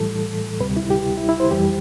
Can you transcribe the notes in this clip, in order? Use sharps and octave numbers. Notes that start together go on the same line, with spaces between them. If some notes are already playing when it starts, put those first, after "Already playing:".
Already playing: A2 E3 G3 A4
D2 C3 G3 B4
E4
G4
E4
E4
C5
F2 E3 G3 G4